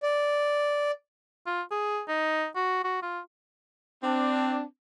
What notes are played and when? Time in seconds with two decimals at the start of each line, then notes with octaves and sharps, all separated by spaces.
0.03 D5
1.47 F4
1.71 G#4
2.08 D#4
2.56 F#4
2.84 F#4
3.02 F4
4.03 C4 D4